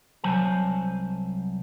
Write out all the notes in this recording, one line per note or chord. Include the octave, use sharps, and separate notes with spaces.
C2 F#3 C5 G#5 A5